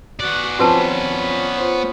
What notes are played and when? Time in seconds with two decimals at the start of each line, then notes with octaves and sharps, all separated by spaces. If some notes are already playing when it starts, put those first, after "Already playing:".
0.20 B3 F#4 D5 F#5
0.59 F3 C4 C#4 F4 F#4 B4 A5 B5
1.57 F4 C5